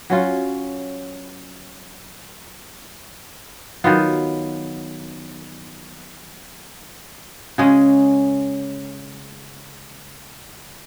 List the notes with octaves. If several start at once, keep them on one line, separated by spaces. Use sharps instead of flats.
F#3 C#4 F4
D#3 F#3 B3 F4
C#3 G#3 C#4